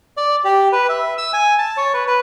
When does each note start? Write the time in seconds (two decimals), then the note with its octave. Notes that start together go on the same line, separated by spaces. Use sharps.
0.17 D5
0.45 G4
0.72 B4
0.89 E5
1.18 E6
1.33 G#5
1.58 A5
1.77 C#5
1.94 B4
2.07 B4